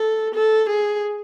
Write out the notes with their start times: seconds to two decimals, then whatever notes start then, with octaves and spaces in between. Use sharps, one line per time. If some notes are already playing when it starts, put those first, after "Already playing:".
Already playing: A4
0.35 A4
0.69 G#4